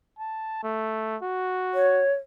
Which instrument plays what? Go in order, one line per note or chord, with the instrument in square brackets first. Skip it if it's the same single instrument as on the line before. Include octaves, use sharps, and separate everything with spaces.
[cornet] A5
A3
F#4
[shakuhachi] C#5